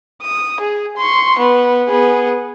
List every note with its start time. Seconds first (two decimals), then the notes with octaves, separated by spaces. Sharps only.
0.21 D#6
0.60 G#4
0.97 C6 C#6
1.38 B3
1.88 B3 G#4